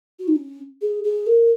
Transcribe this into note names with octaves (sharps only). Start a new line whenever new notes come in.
F#4
D#4
C#4
G#4
G#4
A#4